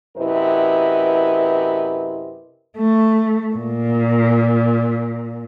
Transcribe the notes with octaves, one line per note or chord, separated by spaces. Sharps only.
F#2 C3 E4 A#4 B4 D#5
A3
A#2